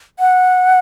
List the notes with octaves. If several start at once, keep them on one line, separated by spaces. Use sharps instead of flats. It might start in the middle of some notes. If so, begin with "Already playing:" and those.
F#5